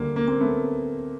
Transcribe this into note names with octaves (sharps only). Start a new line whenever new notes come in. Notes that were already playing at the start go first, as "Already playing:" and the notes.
Already playing: D2 D3 G3 A#3
A#3
A#3 C4
A3 B3